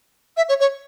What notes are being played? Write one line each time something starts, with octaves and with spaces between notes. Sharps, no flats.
E5
C#5
C#5